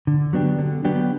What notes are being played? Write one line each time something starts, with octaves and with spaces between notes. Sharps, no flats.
D3
F#3 B3 D4 G4
D3
F#3 B3 D4 G4